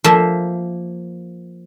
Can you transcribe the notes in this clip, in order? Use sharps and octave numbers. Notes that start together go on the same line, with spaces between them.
F3 A#3 E5